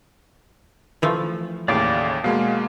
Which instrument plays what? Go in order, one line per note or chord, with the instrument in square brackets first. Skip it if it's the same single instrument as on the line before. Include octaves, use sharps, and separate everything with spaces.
[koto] E3 F3 A3
[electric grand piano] D#2 A2 C#3 [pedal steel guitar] D5 F5 D6
[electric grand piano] B2 G#3 A#3 [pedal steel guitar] F5